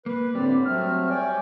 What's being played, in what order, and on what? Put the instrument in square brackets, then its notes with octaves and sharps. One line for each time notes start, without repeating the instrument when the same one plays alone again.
[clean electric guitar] A#3 [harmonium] B4
[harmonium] A2 D3 D5 [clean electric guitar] G3 [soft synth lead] C4
[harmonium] F#3 A3 C4 [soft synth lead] F6
[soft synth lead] C#5 [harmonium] D5 G5 G#5